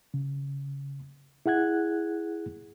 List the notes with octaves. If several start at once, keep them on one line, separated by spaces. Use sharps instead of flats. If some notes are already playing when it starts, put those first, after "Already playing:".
C#3
E4 G#4 F#5 F#6 G#6